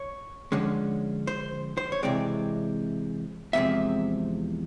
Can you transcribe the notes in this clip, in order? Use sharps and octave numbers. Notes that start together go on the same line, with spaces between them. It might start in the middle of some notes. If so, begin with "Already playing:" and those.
Already playing: C#5
D3 F3 G#3 C#4
C5
C5
C#5
C3 E3 G#3 C4 D5
E2 C3 F3 G#3 C4 E5